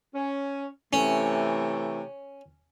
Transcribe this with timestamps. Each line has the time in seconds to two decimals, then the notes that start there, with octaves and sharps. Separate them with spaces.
0.14 C#4
0.93 C3 E3 A3 C#4